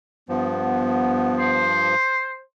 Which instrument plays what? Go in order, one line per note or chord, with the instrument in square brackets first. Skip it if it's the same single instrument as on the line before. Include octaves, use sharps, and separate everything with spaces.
[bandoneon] G2 F3 [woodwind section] B3
[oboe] C5